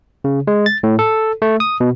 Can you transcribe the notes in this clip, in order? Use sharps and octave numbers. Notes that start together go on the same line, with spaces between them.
C#3
G#3
A6
A2
A4
A3
D#6
B2